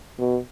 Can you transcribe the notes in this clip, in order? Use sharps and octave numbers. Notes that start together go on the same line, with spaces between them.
B2